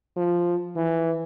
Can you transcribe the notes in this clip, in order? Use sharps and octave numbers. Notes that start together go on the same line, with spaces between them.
F3
E3